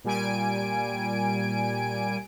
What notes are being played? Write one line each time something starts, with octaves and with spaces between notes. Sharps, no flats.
A#2 G3 G#5 D7